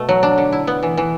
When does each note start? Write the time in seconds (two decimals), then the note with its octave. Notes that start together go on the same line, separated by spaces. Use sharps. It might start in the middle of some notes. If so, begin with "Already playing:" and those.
Already playing: B2 A3
0.09 F#3
0.23 D4
0.38 D3
0.52 E4
0.67 B3
0.83 E3
0.97 E3